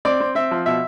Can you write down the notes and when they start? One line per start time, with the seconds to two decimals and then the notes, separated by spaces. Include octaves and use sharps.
0.05 C4 D5
0.20 C4
0.35 C4 E5
0.51 F3
0.66 B2 E5